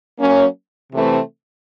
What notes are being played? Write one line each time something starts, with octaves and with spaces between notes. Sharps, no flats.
F#3 A#3 C#4
C3 E3 A3 C4